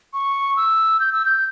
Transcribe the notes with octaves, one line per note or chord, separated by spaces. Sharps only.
C#6
E6
G6
E6
G6